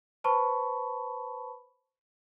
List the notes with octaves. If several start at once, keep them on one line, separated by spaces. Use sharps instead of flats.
B4 C5 A5 B5 C#6